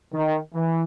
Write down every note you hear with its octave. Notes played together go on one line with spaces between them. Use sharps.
D#3
E3